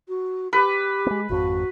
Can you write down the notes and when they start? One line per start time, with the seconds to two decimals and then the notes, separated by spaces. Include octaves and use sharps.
0.08 F#4
0.53 G4 B4
1.06 G#3 B3
1.29 G#1 F2 F#4